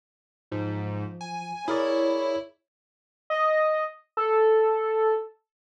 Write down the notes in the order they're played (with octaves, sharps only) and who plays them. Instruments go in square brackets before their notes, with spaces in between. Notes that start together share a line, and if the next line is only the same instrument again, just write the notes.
[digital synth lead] G#2 [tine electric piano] F3
[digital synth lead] G#5
[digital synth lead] E4 [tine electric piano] G#4 A#4 D5 [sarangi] C#5
[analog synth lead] D#5
A4